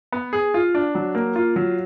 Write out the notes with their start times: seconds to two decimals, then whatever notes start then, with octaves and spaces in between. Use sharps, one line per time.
0.13 B3
0.33 G#4
0.54 F4
0.75 D4
0.95 F#3
1.15 A#3
1.36 F4
1.56 F#3